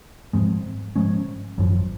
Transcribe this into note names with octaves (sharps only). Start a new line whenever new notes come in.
G#2 F3 G#3 C4
G#2 F3 G#3 C#4
G#1 F#2 F3